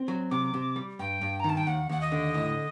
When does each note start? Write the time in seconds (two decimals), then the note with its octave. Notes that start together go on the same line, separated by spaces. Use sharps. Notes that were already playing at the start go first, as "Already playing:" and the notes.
Already playing: C4
0.08 F#3
0.31 C3 D6
0.54 C3
0.76 G3
0.99 G2 G5
1.21 G2
1.40 A#5
1.44 D#3
1.49 A5
1.57 G5
1.67 D#2 F#5
1.89 D#2 F#5
2.01 D#5
2.12 D3
2.34 A2